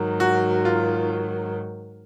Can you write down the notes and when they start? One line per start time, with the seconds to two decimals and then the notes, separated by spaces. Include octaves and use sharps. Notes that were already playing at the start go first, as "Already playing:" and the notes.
Already playing: G#2 D#3 F#3
0.20 F#4
0.65 F4